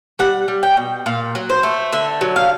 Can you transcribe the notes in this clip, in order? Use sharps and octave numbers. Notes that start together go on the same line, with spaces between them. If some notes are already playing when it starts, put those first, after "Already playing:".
G3 F#5
G3
G5
B2
A#2 F5
F#3
C5
A3
D3 E5
F#3
F5